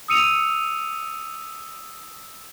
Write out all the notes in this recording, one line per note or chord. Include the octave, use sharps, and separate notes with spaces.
D#6 E6 C#7 D#7 F7